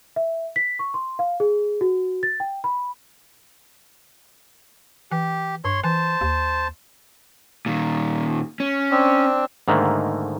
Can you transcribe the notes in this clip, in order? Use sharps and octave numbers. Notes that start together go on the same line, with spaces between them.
E5
B6
C#6
C6
F5
G#4
F#4
A6
G5
B5
E3 G4
G2 C#5 C6
E3 C5 A5
D#2
A#2 D#3
C#4
C4 D4
G#2 D3 D#3 A3 A#3